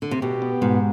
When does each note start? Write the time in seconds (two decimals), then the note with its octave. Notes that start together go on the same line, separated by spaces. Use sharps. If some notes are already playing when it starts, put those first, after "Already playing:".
0.02 D3
0.11 C3
0.22 B2 G4
0.42 B3
0.61 G#2 B2